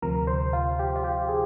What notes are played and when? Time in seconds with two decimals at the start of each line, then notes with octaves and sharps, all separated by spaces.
0.02 D2 C3 F3 A#4
0.27 C5
0.53 F4
0.79 G4
0.96 F4
1.04 G4
1.29 G#4